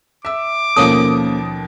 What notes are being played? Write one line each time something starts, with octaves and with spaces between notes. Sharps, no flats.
E5 D6 E6
D#2 B2 F3 A#3 C#4 A4 D#6